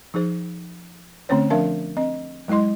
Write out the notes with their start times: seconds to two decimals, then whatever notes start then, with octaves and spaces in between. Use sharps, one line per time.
0.14 F3 D#4 G#4 C5
1.29 D3 A3 C4 C#4 C5 C#5
1.50 F3 D4 A#4 E5 F5 A5
1.97 C4 D#5
2.48 F#3 G#3 E4 D#5 C6